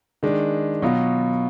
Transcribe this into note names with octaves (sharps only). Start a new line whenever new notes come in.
D#3 G#3 D4
B2 F#3 B3 F4